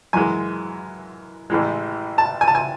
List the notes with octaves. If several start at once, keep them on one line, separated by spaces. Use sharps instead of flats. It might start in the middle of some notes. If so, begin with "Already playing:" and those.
F#2 E3 G#3 G#5
A1 A2 E3 G#3
A5
G#5
A5
G#5